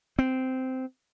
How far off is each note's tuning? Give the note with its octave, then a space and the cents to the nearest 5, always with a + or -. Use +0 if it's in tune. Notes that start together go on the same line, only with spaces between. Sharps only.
C4 -10